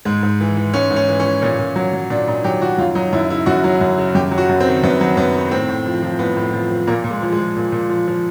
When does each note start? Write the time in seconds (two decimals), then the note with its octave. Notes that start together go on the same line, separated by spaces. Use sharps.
0.05 G#2 G#3
0.23 G#2
0.40 E3
0.56 E3
0.74 G#2 C#4
0.91 G#2
0.96 C#4
1.09 E3
1.20 C#4
1.26 E3
1.42 A#2 C#4
1.59 A#2
1.76 F#3
1.93 F#3
2.10 A#2 D4
2.27 A#2 D#4
2.44 F#3 G4
2.62 F#3 F#4
2.78 F#2 F4
2.95 F#3 D#4
3.13 F#2 E4
3.30 C#3 E4
3.46 F#2 F#4
3.64 F#3
3.81 F#2
3.98 C#3
4.15 F#2 G4
4.31 F#3
4.38 F#4
4.49 F#2
4.60 C4
4.67 D#3
4.83 F#2 B3
5.01 F#3
5.17 F#2 B3
5.35 D#3
5.51 A2 C4
5.69 A2
5.86 F3
6.02 F3
6.19 A2 B3
6.37 A2
6.53 F3
6.71 F3
6.87 A#2 A#3
7.04 A#2
7.11 G#3
7.22 F3
7.33 G#3
7.38 F3
7.56 A#2
7.72 A#2
7.89 F3
8.08 F3